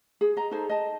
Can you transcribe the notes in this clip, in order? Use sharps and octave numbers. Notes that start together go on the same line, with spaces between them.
G#4
D#5 A#5
D#4 G#4 A4 C5
D#5 A5